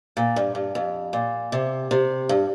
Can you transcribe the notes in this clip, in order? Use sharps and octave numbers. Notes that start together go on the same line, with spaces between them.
A#2
G2
G2
F2
A#2
C3
C3
G2